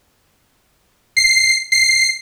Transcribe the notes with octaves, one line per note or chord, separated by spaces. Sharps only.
C7
C7